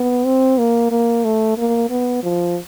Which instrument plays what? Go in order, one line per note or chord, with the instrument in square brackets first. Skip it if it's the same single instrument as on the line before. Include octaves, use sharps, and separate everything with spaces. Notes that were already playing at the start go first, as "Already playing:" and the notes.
Already playing: [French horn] B3
C4
A#3
A#3
A3
A#3
B3
F3